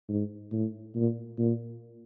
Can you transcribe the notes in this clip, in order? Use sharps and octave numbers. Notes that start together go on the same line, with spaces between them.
G#2
A2
A#2
A#2